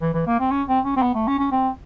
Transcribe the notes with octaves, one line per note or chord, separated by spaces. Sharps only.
E3
E3
A#3
C4
C#4
C4
C#4
C4
B3
A3
C#4
C#4
C4